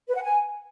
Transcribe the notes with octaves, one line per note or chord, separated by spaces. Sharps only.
B4
F#5
G#5